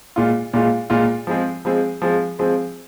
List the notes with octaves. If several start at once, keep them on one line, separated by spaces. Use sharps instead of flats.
A#2 G#3 F4
A#2 G#3 F4
A#2 G#3 F4
F3 G#3 C4 G#4
F3 G#3 C4 G#4
F3 G#3 C4 G#4
F3 G#3 C4 G#4